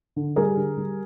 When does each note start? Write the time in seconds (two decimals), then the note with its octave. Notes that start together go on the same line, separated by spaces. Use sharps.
0.16 D3
0.36 G3 G#4 A#4
0.57 D3
0.77 G3